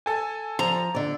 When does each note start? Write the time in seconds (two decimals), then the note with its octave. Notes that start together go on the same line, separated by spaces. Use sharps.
0.06 A4 G#5
0.59 F3 A#5
0.95 D3 D5